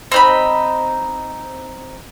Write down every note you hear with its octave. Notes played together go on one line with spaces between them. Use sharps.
C4 D#4 B5